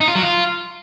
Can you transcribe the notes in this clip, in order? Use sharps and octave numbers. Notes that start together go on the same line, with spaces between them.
D#4
F4
F#3
F4